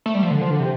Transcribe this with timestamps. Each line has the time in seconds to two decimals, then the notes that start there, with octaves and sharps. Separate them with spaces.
0.06 A3
0.15 G3
0.23 F3
0.31 D3
0.41 F3
0.51 D3
0.60 C3